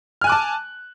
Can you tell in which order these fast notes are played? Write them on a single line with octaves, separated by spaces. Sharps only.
F6 G#5 F#6 D6 A5